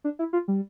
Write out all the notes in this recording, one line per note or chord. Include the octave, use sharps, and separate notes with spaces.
D4
E4
F4
G3